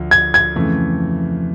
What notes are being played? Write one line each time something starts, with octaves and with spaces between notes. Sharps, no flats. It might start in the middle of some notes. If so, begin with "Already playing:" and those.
Already playing: D2 F3
G#6
G#6
F2 C#3 E3 A3